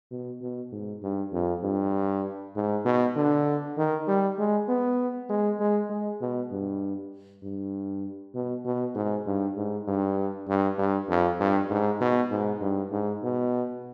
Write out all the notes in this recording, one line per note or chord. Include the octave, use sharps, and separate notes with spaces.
B2
B2
G#2
G2
F2
G2
G#2
B2
D3
D#3
G3
G#3
B3
G#3
G#3
G#3
B2
G2
G2
B2
B2
G#2
G2
G#2
G2
G2
G2
F2
G2
G#2
B2
G#2
G2
G#2
B2